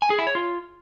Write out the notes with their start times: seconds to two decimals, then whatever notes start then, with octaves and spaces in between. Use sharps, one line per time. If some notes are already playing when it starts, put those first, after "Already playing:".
0.02 G#5
0.10 G#4
0.19 E4
0.27 C#5
0.35 F4